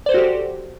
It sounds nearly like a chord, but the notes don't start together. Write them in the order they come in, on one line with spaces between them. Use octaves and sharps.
D5 C5 A4 F#4 G4